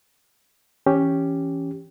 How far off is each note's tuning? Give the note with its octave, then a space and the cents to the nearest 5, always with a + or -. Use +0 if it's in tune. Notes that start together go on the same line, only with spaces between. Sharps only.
E3 +0 C#4 +0 G4 +0